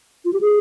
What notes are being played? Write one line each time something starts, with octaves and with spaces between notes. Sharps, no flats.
F4
G4
G#4